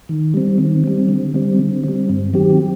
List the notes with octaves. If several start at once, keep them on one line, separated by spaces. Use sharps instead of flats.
D#3
G3 C4
D#3
G3 C4
D3
G3 C4
D3
G3 C4
G2
D#3 F#3 C4 G4